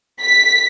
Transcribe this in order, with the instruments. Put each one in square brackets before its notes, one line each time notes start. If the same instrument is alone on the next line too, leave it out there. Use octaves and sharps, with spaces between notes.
[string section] B6